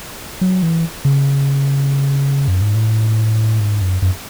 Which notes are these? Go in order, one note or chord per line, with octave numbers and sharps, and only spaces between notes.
F#3
E3
C#3
F#2
G#2
A2
G#2
F#2
F#2